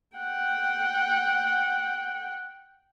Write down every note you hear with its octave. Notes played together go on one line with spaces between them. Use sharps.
F#5 G5